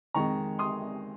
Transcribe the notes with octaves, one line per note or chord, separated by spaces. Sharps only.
F2 D#3 G#3 A#5 C#6
C6 D#6